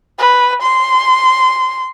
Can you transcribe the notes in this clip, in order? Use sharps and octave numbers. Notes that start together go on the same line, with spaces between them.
B4
C6